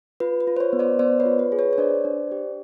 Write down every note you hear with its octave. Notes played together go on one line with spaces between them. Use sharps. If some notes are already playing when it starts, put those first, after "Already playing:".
F4 B4
B4
F4
C5
B4 C#5
B3
C5 D5
B3 C5 D5
B4 C#5
F4
B4
G#4
B4 C#5
C#5
D4 C5 D5
D4
G4